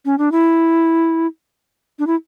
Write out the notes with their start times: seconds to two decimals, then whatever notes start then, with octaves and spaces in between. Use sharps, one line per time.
0.05 C#4
0.18 D4
0.32 E4
1.99 D4
2.07 E4